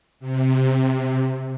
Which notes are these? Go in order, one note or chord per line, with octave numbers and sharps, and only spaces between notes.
C3